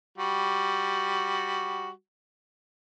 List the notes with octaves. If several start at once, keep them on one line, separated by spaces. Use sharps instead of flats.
G3 F#4